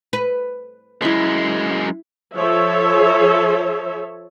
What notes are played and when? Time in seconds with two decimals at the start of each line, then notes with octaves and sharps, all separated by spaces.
0.13 B4
1.02 F#2 G#3 E4 E5
2.35 F3 A4 C#5 E5